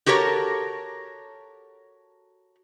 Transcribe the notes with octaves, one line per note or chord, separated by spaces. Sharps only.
F#4 G4 A4 A#4 C#5